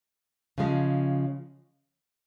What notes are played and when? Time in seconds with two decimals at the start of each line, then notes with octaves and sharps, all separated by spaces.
0.58 C#3 F3 G#3